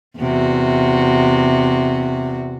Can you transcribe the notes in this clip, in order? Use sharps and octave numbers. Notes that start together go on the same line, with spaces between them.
E2 C3 F#4